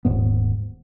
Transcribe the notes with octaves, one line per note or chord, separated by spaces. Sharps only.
D#1 G#2 B3